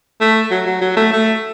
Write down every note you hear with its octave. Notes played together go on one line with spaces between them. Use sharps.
A3
F#3
F#3
F#3
A3
A3